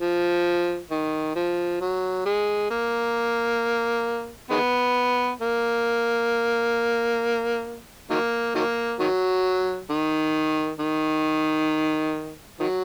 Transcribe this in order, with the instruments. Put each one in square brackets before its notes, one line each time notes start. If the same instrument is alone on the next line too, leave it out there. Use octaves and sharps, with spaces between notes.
[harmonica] F3
D#3
F3
F#3
G#3
A#3
D#3 G#3 B3
A#3
D#3 F#3 A#3
D#3 F#3 A#3
D#3 F#3
D#3
D#3
D#3 F#3